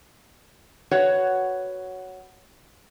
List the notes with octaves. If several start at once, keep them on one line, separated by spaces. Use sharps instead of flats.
F#4 B4 C#5 F#5